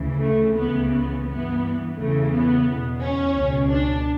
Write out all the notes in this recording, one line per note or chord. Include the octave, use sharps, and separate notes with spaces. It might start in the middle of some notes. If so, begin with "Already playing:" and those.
Already playing: D2 C#3 E3
A3
C#2 C#3 E3 B3
B3
G2 E3 B3
E2 C#3 E3 A3
B3
E2 B2
C#4
C#2 B2
D4